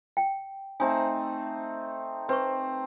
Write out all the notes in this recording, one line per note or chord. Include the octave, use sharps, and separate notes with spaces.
G5
A3 C4 D#4 G#5
C4 B4 C#6